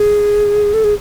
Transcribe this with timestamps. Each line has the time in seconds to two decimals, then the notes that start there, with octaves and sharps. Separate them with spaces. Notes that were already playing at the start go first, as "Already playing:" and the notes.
Already playing: G#4
0.74 A4
0.84 G#4